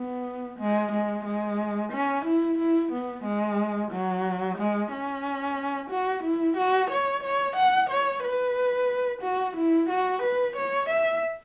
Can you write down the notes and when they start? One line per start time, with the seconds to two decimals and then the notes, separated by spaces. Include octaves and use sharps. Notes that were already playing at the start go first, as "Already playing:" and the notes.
Already playing: B3
0.60 G#3
0.92 G#3
1.25 G#3
1.93 C#4
2.26 E4
2.59 E4
2.93 B3
3.25 G#3
3.92 F#3
4.59 G#3
4.92 C#4
5.91 F#4
6.24 E4
6.58 F#4
6.91 C#5
7.24 C#5
7.57 F#5
7.90 C#5
8.24 B4
9.23 F#4
9.57 E4
9.90 F#4
10.23 B4
10.57 C#5
10.90 E5